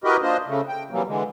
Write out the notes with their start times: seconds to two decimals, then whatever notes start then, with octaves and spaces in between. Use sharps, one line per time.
0.04 E4 F#4 G4 A#4 B4 D#5
0.22 A#3 D4 F4 C5 D#5
0.47 C#3 A3
0.69 G5
0.91 C3 E3 F#3 G3 A#3
1.08 D3 E3 G#3